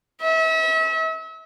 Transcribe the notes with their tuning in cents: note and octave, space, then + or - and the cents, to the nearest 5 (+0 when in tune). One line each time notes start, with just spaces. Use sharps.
E5 -35